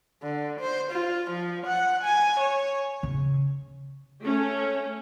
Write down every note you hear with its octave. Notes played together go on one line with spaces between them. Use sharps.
D3
C5
F4
F3
F#5
G#5
C#5
C#3
A3 C#4